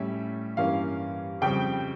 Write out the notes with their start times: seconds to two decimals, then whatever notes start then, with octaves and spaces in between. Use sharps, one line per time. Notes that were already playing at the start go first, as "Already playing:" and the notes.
Already playing: A2 G3 C#4 E5
0.57 G2 E3 A#3 C#4 F5
1.41 F2 C#3 G3 G5